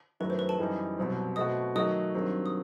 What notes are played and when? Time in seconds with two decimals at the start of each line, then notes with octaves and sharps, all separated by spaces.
0.20 F#2 D#3 F#3 A3 E4 B4
0.30 C5
0.39 B4
0.49 A4 A5
0.58 F#2 E3 G3 D#4
0.98 C2 B2 F#3 C4
1.36 B2 A3 C4 F#4 D#5 D#6
1.75 D#3 F#3 A3 D#4 F#4 D#5 D#6
2.14 G2 D#3 F#3 C4
2.46 D#6